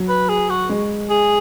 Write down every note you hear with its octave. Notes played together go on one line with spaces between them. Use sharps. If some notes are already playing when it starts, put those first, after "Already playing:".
Already playing: F#3
B4
G#4
F#4
G#3
G#4